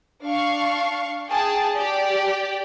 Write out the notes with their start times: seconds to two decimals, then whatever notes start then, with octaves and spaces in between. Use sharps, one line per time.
0.24 D4 F5 C#6
1.30 G#4 G5 A5
1.75 G4 D5